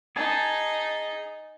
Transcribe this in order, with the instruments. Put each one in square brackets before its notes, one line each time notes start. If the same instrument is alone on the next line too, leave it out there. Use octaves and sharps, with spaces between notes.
[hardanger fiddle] D#4 [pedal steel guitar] G#4 G#5 A5